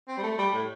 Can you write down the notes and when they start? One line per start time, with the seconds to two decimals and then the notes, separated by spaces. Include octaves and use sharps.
0.08 C4
0.18 G3
0.23 A3
0.38 G3
0.54 A2